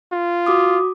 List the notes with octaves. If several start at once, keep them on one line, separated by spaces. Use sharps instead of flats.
F4
F#4 D6 D#6